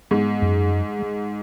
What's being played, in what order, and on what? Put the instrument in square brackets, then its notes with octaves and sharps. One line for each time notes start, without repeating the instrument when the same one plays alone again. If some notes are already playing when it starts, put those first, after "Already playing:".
[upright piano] G#2 [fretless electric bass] B3
[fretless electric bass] F#2
G#3
G#3